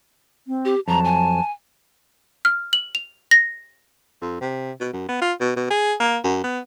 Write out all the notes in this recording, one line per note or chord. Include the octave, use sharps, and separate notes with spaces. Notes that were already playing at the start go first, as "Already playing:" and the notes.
C4
G4
F2 F#3 A5 A#5
G#5
F6
F#7
F7
A#6
F2
C3
B2
F#2
B3
F4
B2
B2
G#4
A#3
F#2
B3